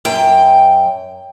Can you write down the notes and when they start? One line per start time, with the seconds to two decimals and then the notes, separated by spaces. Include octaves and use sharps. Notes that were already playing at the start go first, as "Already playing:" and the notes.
0.05 F#2 G5